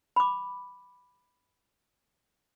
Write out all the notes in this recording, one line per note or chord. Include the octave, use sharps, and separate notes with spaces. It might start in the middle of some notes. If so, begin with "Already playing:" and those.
B5 D6